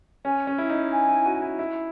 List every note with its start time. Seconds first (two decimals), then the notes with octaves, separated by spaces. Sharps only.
0.25 C#4 G#5
0.47 C#4
0.58 E4
0.70 D#4
0.92 G#5
1.08 E4
1.26 F#4
1.42 E4
1.59 E4